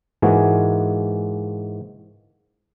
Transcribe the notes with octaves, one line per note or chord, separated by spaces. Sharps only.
G#2 E3 G#3 A#3 F#4 G#4